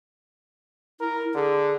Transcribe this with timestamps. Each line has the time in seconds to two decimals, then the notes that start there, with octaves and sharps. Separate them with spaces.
1.01 E4 A#4
1.34 D3 G#4